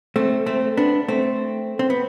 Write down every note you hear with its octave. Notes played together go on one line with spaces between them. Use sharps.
A3 C4
A3 C4
B3 D4
A3 C4
C4
B3